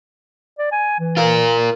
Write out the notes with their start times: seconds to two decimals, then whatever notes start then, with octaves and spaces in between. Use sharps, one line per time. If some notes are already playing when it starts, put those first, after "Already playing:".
0.59 D5
0.72 G#5
0.99 E3
1.17 F4 A#4